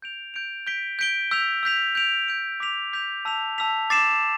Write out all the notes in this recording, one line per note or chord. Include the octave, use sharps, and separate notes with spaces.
G6 D7 F7
G6 D7 F7
G6 B6 D7 G7
G6 B6 D7 G7
E6 G6 B6 F7
E6 G6 B6 F7
G6 D7 F7
G6 D7 F7
D6 G6 B6 F7
D6 G6 B6 F7
A5 E6 B6 F7
A5 E6 B6 F7
D6 A6 C7 E7